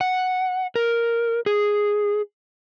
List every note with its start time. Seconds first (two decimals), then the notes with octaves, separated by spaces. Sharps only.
0.01 F#5
0.76 A#4
1.46 G#4